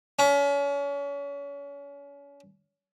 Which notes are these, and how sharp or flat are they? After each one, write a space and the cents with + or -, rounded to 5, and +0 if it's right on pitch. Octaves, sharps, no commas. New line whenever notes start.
C#4 +35